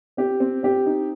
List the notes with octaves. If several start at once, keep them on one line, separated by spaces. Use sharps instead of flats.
C4 G4
C4
C4 G4
D#4